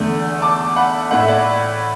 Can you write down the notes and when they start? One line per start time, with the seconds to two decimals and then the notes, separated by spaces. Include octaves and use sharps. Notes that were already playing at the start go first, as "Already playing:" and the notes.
Already playing: E2 D3 A3
0.42 A5 D6
0.76 F#5 B5
1.11 A2 A3 F#5
1.20 E5
1.28 D5 F#5